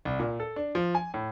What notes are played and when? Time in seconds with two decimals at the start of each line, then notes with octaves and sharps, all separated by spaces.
0.05 C2
0.19 A#2
0.40 A4
0.56 D4
0.75 F3
0.95 G#5
1.14 A2